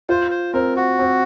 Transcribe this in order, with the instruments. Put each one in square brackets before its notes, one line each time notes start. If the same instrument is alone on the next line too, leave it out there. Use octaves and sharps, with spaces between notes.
[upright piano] F4 [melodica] C5
[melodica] C5
[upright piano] C4 [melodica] A#4
[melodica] F#4
[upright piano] C4